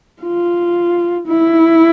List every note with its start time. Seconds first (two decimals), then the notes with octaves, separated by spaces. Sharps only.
0.23 F4
1.28 E4